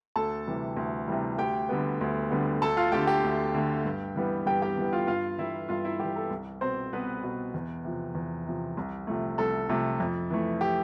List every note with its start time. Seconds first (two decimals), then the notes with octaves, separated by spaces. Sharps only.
0.16 D2 A4 A5
0.47 C3 E3 G3
0.77 D2
1.08 C3 E3 G3
1.38 D2 G4 G5
1.69 D3 G3 B3
2.01 D2
2.30 D3 G3 B3
2.62 D2 A4 A5
2.77 F4 F5
2.92 D3 A3 G4 G5
3.07 G4 G5
3.24 D2
3.54 D3 A3
3.85 G2
4.16 E3 G3 B3
4.46 G2 G4 G5
4.62 G4 G5
4.78 E3 G3 B3
4.93 F4 F5
5.07 G2 F4 F5
5.39 E3 G3 E4 E5
5.69 G2 F4 F5
5.84 E4 E5
5.99 E3 G3 G4
6.16 A4
6.31 C2
6.61 B2 B3 C4 C5
6.93 C2 B3 B4
7.23 B2 B3
7.54 E2
7.84 C3 F3
8.15 E2
8.47 C3 F3
8.77 C2
9.07 C3 F3 A3
9.38 C2 A4
9.69 C3 F3 A3
10.00 F2
10.31 E3 A3
10.61 G4